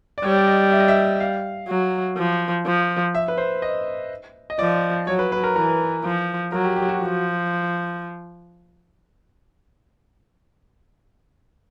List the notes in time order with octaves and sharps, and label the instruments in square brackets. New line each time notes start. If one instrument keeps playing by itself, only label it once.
[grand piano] D5
[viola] G3 [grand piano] C#5
[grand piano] D5
D#5
E5
D#5
E5
F5
[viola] F#3
F3
F3
[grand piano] E5
B4
C5
D#5
D#5
[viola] F3 [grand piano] D5
[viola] F#3 [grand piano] C#5
[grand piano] B4
B4
A#4
[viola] E3 [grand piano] A#4
[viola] F3
[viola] F#3 [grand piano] A#4
[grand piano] G4
G4
F#4
[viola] F3